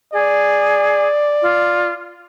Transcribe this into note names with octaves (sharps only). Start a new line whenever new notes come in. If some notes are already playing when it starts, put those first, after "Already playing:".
G#4 D5
F4